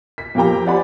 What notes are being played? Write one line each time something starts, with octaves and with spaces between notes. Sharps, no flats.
B6
F2 A#3 G4 G5 A#5
C4 G4 D5 F#5 G#5 B5